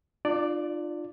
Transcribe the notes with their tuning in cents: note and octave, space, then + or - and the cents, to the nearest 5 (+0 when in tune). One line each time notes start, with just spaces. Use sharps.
D4 +45 F4 +0 D5 +0